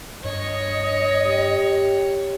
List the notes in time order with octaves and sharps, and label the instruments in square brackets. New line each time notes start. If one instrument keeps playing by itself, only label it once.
[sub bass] G2 [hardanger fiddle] C#5 [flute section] D#5
[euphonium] G4